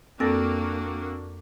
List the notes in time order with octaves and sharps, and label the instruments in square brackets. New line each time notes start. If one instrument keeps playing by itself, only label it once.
[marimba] F2 A4 A#6 [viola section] A#3 D4 F#4 [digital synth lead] C4